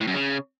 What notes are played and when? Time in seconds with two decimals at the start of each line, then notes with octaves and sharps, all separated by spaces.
0.01 A2
0.07 F#2
0.14 C#3